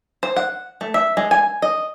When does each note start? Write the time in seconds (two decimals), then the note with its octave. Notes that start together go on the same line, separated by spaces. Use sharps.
0.23 C5
0.37 F#5
0.81 A3
0.94 E5
1.17 G#3
1.31 G#5
1.62 D#5